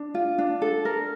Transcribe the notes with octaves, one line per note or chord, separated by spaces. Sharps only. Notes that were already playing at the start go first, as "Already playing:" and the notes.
Already playing: D4
F4
D4
A4
A#4